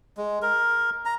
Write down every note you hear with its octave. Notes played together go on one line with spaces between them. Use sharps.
G#3
A#4
A#5